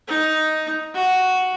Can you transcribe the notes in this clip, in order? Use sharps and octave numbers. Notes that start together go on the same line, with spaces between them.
D#4
F#4